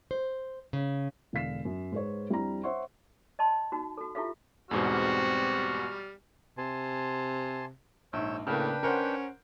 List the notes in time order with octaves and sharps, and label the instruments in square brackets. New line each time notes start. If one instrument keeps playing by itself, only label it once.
[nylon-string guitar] C5
C#3
[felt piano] E1 D3 F5 B6 C7 E7
F#2
G#2 B4 C#5
F2 G3 D4 E4 A#5
C5 C#5 E5 F#5 C6 C#6
[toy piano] D#5 A5 C6
D#4 F#4
F#4 A4
E4 F4 G4 A4 E5 F5
[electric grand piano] E2 G#2 B2 [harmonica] G3 F6 [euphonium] C4 [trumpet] F#4
[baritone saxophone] C3 [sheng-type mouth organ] G#5 A5 C6
[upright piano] A#1 G#2 [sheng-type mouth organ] C#5 E6 G6
[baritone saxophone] A2 [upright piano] C#3 A#3 [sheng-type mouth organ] D4 B4 G5
[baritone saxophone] C#4 [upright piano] A#4 C5 F#5